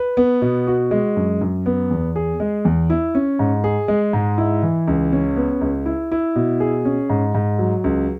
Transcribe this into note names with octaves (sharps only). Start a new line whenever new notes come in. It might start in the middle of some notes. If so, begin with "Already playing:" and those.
Already playing: B4
B3
B2
F#4
G#3
F#2
F#2
B3
E2
G#4
G#3
E2
E4
C#4
G#2
G#4
G#3
G#2
E4
E3
C#2
C#4
B3
C#2
E4
E4
B2
G#4
C#4
G#2
G#2
F#3
C#2